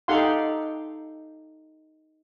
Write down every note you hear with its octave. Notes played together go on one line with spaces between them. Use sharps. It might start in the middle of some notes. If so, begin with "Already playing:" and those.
D#4 G4 A4 F5 F#5 C6